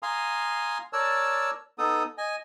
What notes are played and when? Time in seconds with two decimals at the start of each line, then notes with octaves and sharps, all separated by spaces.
0.03 F5 G#5 A#5 C6 D#6
0.93 A#4 C#5 D5 A5 E6
1.78 B3 D#4 A4 D#6
2.18 D#5 G#5